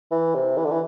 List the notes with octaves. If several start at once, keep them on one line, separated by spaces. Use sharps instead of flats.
E3
C3
E3
D3
E3